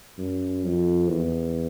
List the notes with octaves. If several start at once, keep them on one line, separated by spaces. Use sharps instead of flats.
F#2
F2
E2